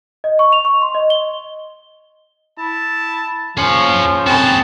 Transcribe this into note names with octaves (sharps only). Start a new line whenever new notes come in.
D#5
C#6
F7
C#6
C6
D#5
G7
E4 A5
F3 C#4 G#4 F5 F#5
C4 F#4 G#4 A4 A5 B5